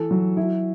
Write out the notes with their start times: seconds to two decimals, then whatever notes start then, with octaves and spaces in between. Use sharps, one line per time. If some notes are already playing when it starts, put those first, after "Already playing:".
Already playing: E3 A4
0.11 F#3
0.37 E4